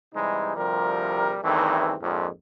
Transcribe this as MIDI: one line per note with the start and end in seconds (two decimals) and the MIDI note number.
0.15 0.55 48
0.15 0.55 52
0.15 0.55 55
0.15 0.55 56
0.15 0.55 63
0.56 1.38 38
0.56 1.38 48
0.56 1.38 53
0.56 1.38 55
0.56 1.38 70
1.44 1.95 40
1.44 1.95 43
1.44 1.95 51
1.44 1.95 52
1.44 1.95 57
1.44 1.95 60
2.02 2.28 34
2.02 2.28 41
2.02 2.28 44